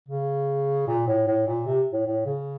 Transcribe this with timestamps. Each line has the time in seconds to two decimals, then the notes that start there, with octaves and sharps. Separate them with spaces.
0.09 C#3
0.87 A#2
1.08 A2
1.28 A2
1.47 A#2
1.67 C3
1.93 A2
2.06 A2
2.26 C#3